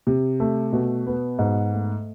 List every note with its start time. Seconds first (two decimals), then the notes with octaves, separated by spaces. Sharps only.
0.07 C3
0.40 A3
0.73 B2
1.07 B3
1.39 G#2
1.73 A3